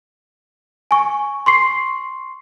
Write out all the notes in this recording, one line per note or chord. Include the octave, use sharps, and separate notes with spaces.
G#5 C#6
C6 C#6 C7